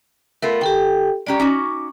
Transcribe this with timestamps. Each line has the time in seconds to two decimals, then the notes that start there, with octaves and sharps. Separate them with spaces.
0.42 A3 B3 F4 A#4
0.61 D#3 G4 A4 G5
1.27 G#3 C#4 G4 D5 A#5
1.40 C#4 D#4 F#4 D6